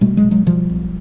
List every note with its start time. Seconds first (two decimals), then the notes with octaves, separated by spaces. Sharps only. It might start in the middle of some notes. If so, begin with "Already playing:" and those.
0.01 B2 G3 A3
0.17 F#3 G#3
0.24 B2
0.31 F#3 G#3
0.46 B2 F3 G3
0.69 B1